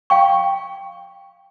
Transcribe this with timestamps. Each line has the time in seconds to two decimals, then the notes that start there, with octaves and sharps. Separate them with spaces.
0.10 F5 G5 C#6